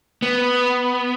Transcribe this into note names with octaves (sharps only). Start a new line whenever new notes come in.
B3